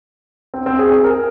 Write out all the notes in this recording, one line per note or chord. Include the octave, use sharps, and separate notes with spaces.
C4
C4
G#4
G#4
A#4